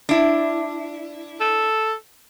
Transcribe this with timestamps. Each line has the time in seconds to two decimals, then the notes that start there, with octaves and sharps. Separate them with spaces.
0.09 D4 E4
1.41 A4